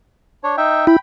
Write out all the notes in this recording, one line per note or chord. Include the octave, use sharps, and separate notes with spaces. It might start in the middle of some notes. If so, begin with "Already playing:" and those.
D4 C#5
D#4 E5 G5
E4 G5 B5